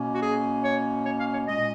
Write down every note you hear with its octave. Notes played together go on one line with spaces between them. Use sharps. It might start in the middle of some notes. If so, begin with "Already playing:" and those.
Already playing: B2 A#3 C#4
F#4
G#4
C#5
C#5
F5
C#5
A#2 G#3 C#4 D#5